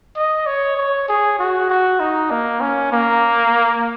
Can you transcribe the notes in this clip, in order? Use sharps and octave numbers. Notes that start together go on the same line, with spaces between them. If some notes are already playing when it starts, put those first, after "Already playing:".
D#5
C#5
C#5
G#4
F#4
F#4
D#4
A#3
C#4
A#3